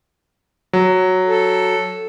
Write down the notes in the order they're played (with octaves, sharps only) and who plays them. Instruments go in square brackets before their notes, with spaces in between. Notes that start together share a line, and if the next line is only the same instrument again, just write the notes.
[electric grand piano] F#3
[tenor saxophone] A4